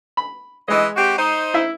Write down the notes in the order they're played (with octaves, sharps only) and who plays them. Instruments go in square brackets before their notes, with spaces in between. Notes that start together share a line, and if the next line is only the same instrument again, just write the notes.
[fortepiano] B5
[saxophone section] E3 D#5 [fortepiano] G#3
[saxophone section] C4 F#4 G4
D#4 C5
[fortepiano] E4 E5